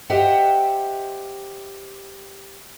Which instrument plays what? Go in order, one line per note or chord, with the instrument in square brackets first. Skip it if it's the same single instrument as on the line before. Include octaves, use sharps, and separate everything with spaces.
[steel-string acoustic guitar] G4 C5 D#5 E5 F#5 G5